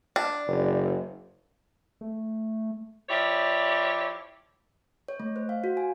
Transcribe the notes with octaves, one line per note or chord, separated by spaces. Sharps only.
D4
F#1
A3
F3 E4 G4 C#5 D5
C#5
A3
C5
F5
F#4
G#5